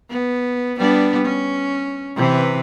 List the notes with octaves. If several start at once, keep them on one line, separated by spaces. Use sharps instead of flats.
B3
G3 B3 D4
C#4
C3 E3 B4